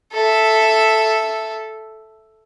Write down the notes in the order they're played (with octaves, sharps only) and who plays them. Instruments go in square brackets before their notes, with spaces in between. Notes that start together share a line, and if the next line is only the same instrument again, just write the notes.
[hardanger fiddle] A4 E5